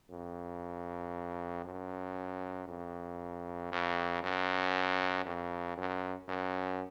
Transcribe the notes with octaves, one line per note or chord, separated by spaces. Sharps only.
F2
F#2
F2
F2
F#2
F2
F#2
F#2